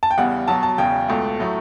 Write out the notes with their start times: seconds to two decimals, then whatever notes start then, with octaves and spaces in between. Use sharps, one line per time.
0.03 A5
0.11 G5
0.18 E2 C#3 G3 F#5
0.48 B1 B2 F#3 A5
0.63 A5
0.78 E1 E2 C#3 G5
1.08 C#2 B2 A3
1.40 A2 F#3 A3